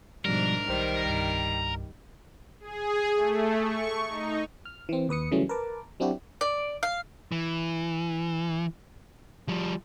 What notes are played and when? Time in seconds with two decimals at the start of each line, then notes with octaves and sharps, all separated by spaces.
0.25 G#2 B2 F3 G3 D4 A#4
0.69 B1 D#3 G3 C5
1.06 C2 G2
2.60 G#4
3.15 A3
3.61 C#6
4.08 D#4
4.65 F6
4.89 E3 C4
5.09 D#2 B4 D#6 C#7
5.31 C#3 E3 F#3 G3 A3 C#4
5.49 A#4 B4 A5 D6
6.00 F#3 C4 D4 E4 F#4 G4
6.41 D5
6.83 F5
7.32 E3
9.48 F3 G3